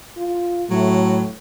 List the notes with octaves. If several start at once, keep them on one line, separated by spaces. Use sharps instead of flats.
F4
A2 F#3 A3